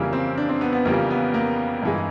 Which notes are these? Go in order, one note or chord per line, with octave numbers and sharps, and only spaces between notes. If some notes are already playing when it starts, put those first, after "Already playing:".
Already playing: F2 C#3 E3 G3 A#3
C4
D4
C4
B3
B3
F2 C#3 E3 G3 A#3
B3
A#3
G2 E3 G#3